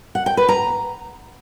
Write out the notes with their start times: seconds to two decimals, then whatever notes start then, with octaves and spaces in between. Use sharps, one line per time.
0.15 F#5
0.26 G5
0.37 B4
0.49 A#5